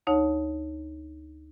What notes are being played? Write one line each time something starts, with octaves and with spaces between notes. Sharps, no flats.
D2 D#4 C#5 A5